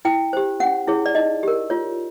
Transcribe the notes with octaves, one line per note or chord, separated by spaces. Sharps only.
E4 G5
G4 C5
C#4 F#5
E4 G#4 C#5
D5
D#4 D#5
G4 A#4
F4 C#5